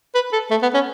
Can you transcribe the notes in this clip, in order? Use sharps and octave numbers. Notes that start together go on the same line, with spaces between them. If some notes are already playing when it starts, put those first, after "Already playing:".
B4
A4
A3
B3
C#4